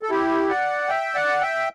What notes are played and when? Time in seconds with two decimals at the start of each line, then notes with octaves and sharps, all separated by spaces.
0.03 A4
0.10 E4 G4
0.49 D5 F#5
0.89 E5 G5
1.15 D5 F#5
1.41 E5 G5